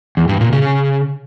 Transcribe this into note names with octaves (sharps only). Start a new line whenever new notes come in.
E2
G2
A#2
C#3